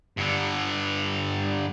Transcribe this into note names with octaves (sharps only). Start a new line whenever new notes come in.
G2 D3